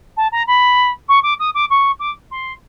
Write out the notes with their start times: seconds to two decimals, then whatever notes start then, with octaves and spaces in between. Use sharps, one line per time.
0.16 A5
0.32 A#5
0.47 B5
1.08 C#6
1.23 D6
1.39 D#6
1.54 D6
1.70 C#6
1.99 D6
2.31 C6